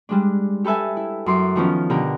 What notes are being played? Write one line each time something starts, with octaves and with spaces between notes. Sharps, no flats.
G3 G#3 D4
G4 A4 B4 E5 G#5
E4
F#2 C6 D6
D#3 F3 B3 C#4
B2 D3 G4 A#4